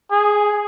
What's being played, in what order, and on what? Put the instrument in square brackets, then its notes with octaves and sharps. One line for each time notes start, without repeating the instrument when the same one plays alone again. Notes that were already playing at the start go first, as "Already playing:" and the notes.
[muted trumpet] G#4